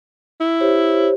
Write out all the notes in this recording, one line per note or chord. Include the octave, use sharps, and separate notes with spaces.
E4
G4 C5 C#5